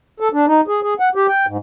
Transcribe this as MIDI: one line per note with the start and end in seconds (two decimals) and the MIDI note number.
0.20 0.28 69
0.33 0.46 62
0.47 0.61 63
0.68 0.80 68
0.83 0.94 68
1.00 1.09 78
1.15 1.27 67
1.28 1.46 79
1.47 1.57 44